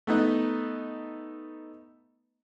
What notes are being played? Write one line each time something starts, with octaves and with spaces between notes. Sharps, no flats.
A3 B3 D#4